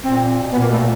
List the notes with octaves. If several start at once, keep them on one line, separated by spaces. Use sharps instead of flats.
A#2 C4
B2
B3
A#2
A#3
B2 A3
A#2